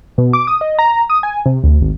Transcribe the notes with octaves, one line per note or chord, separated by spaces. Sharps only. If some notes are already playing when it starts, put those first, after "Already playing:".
B2
D6
D#6
D#5
A#5
D#6
G#5
C3
D2
G#1